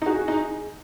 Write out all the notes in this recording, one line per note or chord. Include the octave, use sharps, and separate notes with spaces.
D#4
F#4 G#4
D#4